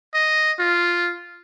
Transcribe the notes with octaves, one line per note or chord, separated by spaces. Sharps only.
D#5
F4